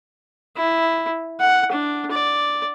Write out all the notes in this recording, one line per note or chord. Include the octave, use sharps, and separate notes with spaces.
E4
F#5
D4
D5